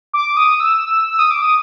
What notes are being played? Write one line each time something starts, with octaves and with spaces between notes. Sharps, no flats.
D6
D#6
E6
E6
D#6
D6
D#6